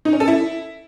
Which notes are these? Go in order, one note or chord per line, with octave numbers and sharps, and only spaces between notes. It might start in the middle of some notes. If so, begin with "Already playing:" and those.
D#4
C#4
A4
E4